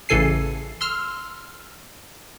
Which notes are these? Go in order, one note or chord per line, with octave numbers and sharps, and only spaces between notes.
A1 C#3 E3 A4 G#5 C7
C6 E6 F6